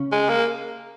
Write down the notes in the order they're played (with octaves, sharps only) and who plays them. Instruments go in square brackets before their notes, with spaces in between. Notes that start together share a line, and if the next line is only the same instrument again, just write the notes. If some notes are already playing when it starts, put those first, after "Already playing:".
Already playing: [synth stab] C#3 C#4
[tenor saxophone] G#3
A#3